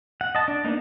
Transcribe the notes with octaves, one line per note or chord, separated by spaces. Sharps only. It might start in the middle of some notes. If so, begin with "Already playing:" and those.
F#5
D#5 A5
D4
A#3 B3 D4 D#4